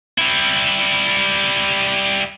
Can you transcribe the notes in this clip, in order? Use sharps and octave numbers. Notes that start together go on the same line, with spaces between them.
G3 E4